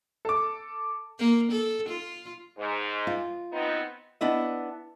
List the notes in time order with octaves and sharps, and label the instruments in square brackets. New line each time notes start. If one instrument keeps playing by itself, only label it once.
[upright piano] A4 D6
[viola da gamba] A#3
A4
F4
[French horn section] G#2
[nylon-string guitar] F4
[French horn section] B3 C4 D#4
[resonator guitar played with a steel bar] B3 D4 E4 D#5